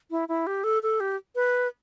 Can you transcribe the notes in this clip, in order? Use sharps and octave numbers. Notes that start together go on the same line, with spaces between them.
E4
E4
G4
A4
A4
G4
B4